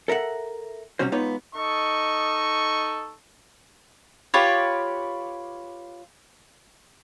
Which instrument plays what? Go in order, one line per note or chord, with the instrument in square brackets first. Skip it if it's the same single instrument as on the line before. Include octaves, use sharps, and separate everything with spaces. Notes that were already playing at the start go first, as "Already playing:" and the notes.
[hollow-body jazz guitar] A4 A#4 E5 F#5
B1 C3 G3 C#4 F#4 C5
G#3 B3 D#4 F4 G4 C#5
[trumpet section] D#4 A4 D#5 C#6
[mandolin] F4 G4 B4 C#5